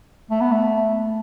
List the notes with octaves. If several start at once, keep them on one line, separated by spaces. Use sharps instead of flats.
A3
B3
A3